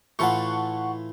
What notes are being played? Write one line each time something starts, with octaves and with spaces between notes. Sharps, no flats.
A2 E3 F4 F#5 A5 C#6